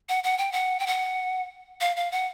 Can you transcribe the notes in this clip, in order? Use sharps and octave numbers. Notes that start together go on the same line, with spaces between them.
F#5
F#5
G5
F#5
G5
F#5
F5
F5
F#5